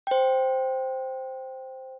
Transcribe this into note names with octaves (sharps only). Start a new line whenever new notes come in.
C5 G5